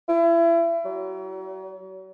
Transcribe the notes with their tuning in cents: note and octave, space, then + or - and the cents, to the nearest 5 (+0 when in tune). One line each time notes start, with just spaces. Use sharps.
E4 +30
F#3 +40